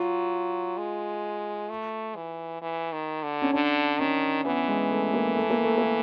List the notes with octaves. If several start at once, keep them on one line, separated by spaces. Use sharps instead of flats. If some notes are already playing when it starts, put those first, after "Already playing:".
Already playing: F#3 F4
G#3
A3
E3
E3
D#3
D3
C#4
D3 D4
D#3 C#4
E3 B3
G#3
A3
A#3
A3
A#3
A3
A#3